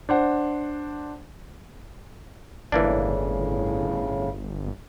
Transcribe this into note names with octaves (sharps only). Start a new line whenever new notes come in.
D4 C5 F#5
G1 A2 C#3 E3 A#3 D4